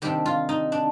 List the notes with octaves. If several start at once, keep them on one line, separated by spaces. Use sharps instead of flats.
C3 D#3 G3 D4 G4
F4
D#4
D4